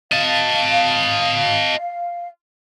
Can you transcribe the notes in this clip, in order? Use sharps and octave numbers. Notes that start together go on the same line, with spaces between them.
D#5 F5 A5